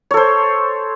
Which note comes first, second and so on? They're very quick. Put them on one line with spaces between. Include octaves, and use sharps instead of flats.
C#5 A4 C5